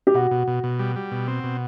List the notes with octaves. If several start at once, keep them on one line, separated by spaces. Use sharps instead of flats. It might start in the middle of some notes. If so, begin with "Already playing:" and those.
G4
B2 F#4
B2
B2
B2
G3
G3
B2
C4
B2